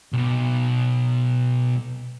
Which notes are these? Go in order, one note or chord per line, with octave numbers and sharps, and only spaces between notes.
B1 B2